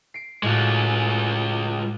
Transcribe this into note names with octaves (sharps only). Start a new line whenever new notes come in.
C7 D7
A2 G#3 A3 F4 F#4